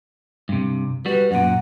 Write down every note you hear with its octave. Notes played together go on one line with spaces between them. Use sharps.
G2 C3
G3 F#4 B4
F#2 A#2 F#5